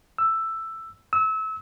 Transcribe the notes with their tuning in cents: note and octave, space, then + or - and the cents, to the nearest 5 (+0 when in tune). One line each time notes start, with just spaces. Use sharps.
E6 +5
E6 -30